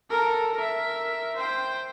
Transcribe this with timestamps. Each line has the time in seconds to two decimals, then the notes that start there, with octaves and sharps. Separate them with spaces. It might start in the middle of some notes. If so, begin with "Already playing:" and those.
0.10 A4 A#4
0.55 A#4 E5
1.36 C5 G5